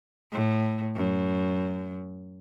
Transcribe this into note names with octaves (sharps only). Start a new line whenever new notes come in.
A2
F#2